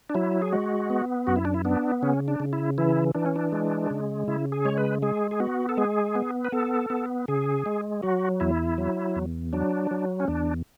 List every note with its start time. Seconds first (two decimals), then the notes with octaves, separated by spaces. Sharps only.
0.10 D4
0.15 F#3 E4
0.42 G#4
0.53 G#3 F#4
0.90 B3
1.27 F#2 F#4
1.36 E4
1.45 D4
1.54 E4
1.65 B3 D4
2.02 C#3 C#4
2.28 D4
2.40 C#3
2.53 E4
2.78 E3 E4
3.15 E3 D4
3.26 C#4
3.36 D4
3.52 G#3
3.90 C#3
4.28 C#3 E4
4.52 G#4
4.65 G#3 C#5
4.78 B4
5.02 G#3 G#4
5.31 G#4
5.40 B3 F#4
5.69 A4
5.77 G#3 G#4
6.15 B3
6.45 B4
6.52 B3 A4
6.90 B3
7.28 C#3 G#4
7.66 G#3
8.02 F#3 F#4
8.40 E2 E4
8.78 F#3
9.16 E2
9.53 F#3 D4
9.91 F#3
10.20 C#4
10.28 E2 D4